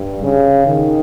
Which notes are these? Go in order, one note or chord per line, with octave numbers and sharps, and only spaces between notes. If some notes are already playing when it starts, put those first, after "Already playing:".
Already playing: G2
C#3
D#3